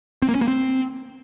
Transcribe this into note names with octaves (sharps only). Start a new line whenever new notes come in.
C4
A#3
C#4
A#3
C4